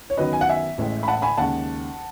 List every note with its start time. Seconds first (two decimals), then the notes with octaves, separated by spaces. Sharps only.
0.10 C#5
0.17 F#2 D#3 F#3 B3 B4 D#5
0.33 G#5
0.41 F#5
0.49 E5 G#5
0.78 A1 A2 G#3
1.03 B5
1.08 F#5 A5
1.22 G#5 B5
1.37 D#2 C#3 G#3 F#5 A5